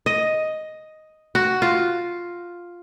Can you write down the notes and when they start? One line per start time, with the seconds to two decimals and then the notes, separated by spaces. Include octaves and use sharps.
0.06 D#5
1.35 F#4
1.62 F4